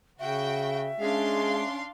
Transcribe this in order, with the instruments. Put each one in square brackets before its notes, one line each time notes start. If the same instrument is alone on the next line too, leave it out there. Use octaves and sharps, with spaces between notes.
[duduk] C#3 [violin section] F#4 G5 [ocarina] E5
[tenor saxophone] G#3 [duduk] C#4 [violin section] D4 F5 C6